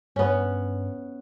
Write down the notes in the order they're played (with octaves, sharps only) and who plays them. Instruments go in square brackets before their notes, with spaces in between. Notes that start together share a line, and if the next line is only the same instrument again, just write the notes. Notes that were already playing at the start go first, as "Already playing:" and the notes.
[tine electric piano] G2 [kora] B3 C#4